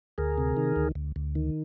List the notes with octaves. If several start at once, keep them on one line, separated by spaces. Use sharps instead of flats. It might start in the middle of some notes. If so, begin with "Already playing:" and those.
D2 G#4 A#4
C3
D#3
D2
D2
D2
D#3